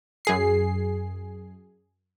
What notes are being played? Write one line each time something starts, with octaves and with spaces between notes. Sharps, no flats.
F#2 G#4 C7